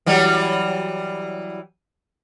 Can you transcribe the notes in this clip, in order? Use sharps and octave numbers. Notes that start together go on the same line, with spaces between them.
E3 F#3 G3